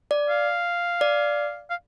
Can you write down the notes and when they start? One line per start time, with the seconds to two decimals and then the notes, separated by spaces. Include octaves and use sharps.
0.11 D5
0.30 F5
1.01 D5
1.70 F5